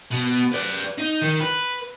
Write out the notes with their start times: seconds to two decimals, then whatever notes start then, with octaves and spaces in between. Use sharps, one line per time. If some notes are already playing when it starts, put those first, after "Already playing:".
0.11 B2
0.52 B4 D5
0.98 D#4
1.22 D#3
1.40 B4